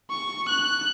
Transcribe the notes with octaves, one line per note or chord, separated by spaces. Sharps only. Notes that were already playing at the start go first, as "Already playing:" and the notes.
C#6
F#6